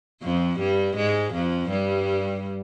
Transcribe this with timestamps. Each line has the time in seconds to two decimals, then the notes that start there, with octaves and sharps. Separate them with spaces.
0.23 F2 F3
0.59 G2 G3
0.96 G#2 G#3
1.33 F2 F3
1.70 G2 G3